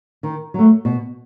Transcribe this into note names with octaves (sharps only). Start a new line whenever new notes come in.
D#3
F#3 A3
B2